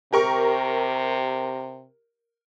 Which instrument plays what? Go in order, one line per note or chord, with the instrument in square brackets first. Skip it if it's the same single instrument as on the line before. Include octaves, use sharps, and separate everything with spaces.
[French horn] C3 [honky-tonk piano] G4 A#4 C#6